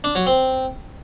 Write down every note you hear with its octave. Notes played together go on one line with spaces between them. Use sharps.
D4
F#3
C4